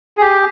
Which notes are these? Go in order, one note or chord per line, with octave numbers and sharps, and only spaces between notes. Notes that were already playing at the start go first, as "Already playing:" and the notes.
G#4
G4